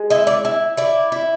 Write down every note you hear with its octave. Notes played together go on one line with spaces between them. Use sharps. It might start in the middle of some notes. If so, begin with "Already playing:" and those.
Already playing: G#3
E4 D#5
D5
E4
E4 D5
E4